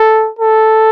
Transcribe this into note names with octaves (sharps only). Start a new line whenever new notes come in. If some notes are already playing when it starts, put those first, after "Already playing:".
Already playing: A4
A4